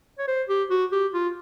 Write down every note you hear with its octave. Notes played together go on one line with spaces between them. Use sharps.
C#5
C5
G4
F#4
G4
F4